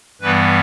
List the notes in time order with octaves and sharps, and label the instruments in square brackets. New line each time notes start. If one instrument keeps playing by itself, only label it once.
[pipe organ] G2 E3 G3 B3 B4